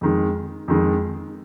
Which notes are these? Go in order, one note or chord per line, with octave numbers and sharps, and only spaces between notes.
F2 D#3 G#3
F2 D#3 G#3